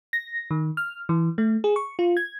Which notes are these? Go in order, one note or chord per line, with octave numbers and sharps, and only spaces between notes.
A#6
D#3
F6
E3
A3
G#4
C#6
F4
G#6